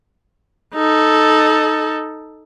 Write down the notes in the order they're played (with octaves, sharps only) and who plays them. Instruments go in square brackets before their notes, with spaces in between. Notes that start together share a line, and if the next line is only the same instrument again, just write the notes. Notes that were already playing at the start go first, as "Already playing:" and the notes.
[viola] D#4 A4